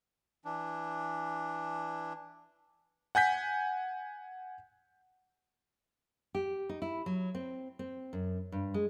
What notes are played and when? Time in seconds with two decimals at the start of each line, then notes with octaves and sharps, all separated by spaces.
0.45 E3 D4
3.15 F#5 G#5 G6 B6
6.35 G4
6.69 D#4
6.82 E4
7.06 F#3
7.35 C4
7.79 C4
8.13 F#2
8.52 G2
8.74 G#3